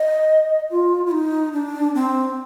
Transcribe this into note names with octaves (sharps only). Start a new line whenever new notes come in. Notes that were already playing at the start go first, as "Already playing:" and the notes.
Already playing: D#5
F4
F4
D#4
D4
C4